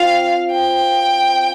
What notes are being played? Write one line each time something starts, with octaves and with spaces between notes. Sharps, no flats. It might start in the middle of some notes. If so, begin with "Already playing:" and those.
Already playing: C4 F4 F5
G5